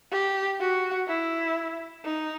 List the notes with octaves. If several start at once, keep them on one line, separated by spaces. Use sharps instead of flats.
G4
F#4
E4
D#4